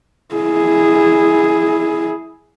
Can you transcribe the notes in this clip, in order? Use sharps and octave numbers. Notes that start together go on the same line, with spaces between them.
E4 G#4